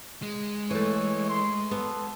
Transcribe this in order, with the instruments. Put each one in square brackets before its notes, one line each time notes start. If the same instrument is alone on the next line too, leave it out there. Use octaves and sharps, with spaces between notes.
[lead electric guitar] G#3
[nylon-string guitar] E3 A3 [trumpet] C#5
[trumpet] C6
[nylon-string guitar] B3 [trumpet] A4